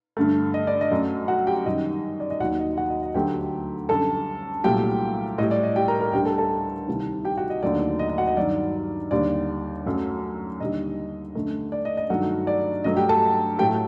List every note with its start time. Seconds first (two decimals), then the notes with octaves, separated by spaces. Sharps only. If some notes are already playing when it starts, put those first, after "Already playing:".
0.17 G2 D3 A3
0.54 D#5
0.67 D5
0.81 D#5
0.91 F#2 F#3 A3
1.28 F#4 F#5
1.47 G4 G5
1.66 F#2 D#3 G3 D#5
2.20 D5
2.31 D#5
2.40 D#2 D#3 F#3 F#4 F#5
2.59 D#5
2.77 F#4 F#5
2.90 D#5
3.03 D#5
3.14 D2 D3 F#3 A3 G4 G5
3.89 F#2 D3 G3 A4 A5
4.64 C2 A#2 F#3 A3 G4 G5
5.38 A2 D#5
5.42 G3
5.51 D5
5.63 D#5
5.76 G4 G5
5.88 A#4 A#5
6.01 A#4 A#5
6.13 D2 D3 G3 G4 G5
6.25 A4 A5
6.38 A4 A5
6.88 C2 C3 D#3
7.25 G4 G5
7.37 F#4 F#5
7.50 D#5
7.62 D#2 D3 F#3 A3 D5
7.99 D#5
8.09 D#5
8.18 F#4 F#5
8.27 D#5
8.37 G2 D#3 F#3 D5
9.11 D#2 D3 G3 D5
9.86 F#2 F#3 A3
10.60 D#2 D3 G3 D#5
11.35 F#2 D3 A3
11.72 D5
11.85 D#5
11.97 D#5
12.10 G2 D#3 F#3 A3 F#4 F#5
12.47 D5
12.84 G2 F#3 A3 D#5
12.97 G4 G5
13.09 A4 A5
13.58 A2 F#3 A3 G4 G5